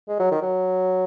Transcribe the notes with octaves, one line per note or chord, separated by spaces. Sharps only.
G#3
F#3
D#3
F#3